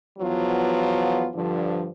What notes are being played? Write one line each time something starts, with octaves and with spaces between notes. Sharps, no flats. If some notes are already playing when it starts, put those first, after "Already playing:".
E2 F3 F#3 B3 F4
G2 D3 F3